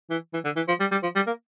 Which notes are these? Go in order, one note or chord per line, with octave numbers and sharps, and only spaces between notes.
E3
E3
D3
E3
F3
G3
G3
F3
G3
A#3